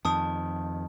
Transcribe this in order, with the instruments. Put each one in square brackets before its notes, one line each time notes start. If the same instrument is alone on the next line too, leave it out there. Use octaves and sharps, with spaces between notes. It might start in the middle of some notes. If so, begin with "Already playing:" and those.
[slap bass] F2 D#3 [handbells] A5 D#6